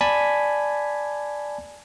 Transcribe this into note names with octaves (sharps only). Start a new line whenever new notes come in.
D5 G#5 A5 B5 G#6 B6